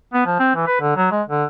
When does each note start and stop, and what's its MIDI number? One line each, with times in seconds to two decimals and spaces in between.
0.13 0.24 59
0.26 0.35 53
0.39 0.54 60
0.55 0.67 52
0.67 0.79 71
0.81 0.93 50
0.97 1.07 54
1.11 1.22 56
1.28 1.45 50